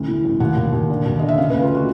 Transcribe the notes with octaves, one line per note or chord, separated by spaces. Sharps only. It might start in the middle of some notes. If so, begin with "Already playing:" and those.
Already playing: A1 D2
E3
A1
D#2 F#5
D#2
D#2
D3
D#2
D3 D#5
E5
C#3 F5
D2 B4
F4
F#4